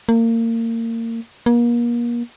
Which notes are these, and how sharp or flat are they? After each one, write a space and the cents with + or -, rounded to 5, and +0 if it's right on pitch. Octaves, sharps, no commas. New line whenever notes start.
A#3 -30
A#3 +35